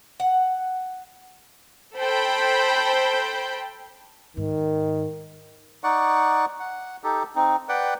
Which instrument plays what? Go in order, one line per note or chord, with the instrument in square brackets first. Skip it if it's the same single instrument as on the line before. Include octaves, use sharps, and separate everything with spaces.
[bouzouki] F#5
[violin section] A4 C5 G5 B5 G6
[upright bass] G#2 [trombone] D#3
[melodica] D#4 D5 F#5 C#6
F#5
D#4 G4 A4
C4 D#4
B4 D5 F#5 G5